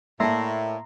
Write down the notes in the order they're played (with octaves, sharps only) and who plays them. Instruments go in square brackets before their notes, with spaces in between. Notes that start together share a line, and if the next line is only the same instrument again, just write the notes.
[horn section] A2 [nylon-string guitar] A#3 D5 A5 [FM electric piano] E5 [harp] A#5 C6